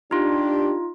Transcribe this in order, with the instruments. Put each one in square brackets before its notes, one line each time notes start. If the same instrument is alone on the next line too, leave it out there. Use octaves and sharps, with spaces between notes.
[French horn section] D4 G4 [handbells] D#4 F4